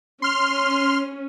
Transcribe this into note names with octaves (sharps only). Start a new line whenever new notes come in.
C#4 C6 F6